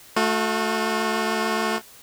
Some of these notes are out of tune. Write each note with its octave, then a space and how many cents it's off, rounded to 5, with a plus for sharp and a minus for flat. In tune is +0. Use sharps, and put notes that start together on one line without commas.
A3 +0 F#4 -40